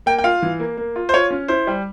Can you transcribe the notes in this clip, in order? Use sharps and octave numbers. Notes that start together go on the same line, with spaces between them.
A#3 G5
G5
F4 F5
E3
A#3
A#3
F4
C5
F4 C#5
C#4
E4 C5
G3